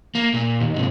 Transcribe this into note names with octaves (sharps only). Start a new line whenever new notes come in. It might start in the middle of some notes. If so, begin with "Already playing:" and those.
A#3
A#2
D#2
G#2 C3